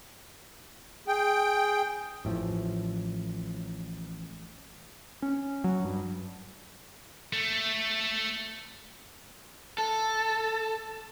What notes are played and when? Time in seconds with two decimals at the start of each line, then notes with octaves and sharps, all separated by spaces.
1.08 G#4 G5
2.25 A1 A2 C#3 F3
5.22 C#4
5.64 F#3
5.85 G2
7.33 A3
9.78 A4